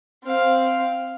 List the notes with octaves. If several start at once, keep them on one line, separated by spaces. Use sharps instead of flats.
C4 F5